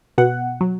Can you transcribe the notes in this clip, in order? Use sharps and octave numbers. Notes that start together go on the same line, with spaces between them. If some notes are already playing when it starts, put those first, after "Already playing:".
B2 F#5
F#3